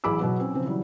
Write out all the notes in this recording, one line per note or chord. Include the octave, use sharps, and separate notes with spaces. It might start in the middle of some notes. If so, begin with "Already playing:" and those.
A1 F#3 G#4 B5 D6 E6
B2 F#3 B3
C4 C#4
C#3 F3 C4
E3 F#3 G3